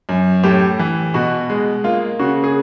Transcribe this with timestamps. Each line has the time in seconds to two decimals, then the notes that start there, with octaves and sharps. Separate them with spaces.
0.09 F#2
0.43 A2 G4
0.79 E3
1.14 B2 F#4
1.50 G#3
1.84 A#3 F4
2.19 C#3 F#4
2.44 G#4